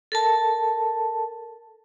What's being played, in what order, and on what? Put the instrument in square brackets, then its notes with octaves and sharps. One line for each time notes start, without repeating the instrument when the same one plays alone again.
[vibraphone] A4 A#4 A5